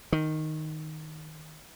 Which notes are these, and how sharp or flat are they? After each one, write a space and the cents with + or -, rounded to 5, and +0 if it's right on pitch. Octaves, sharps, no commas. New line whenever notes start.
D#3 +0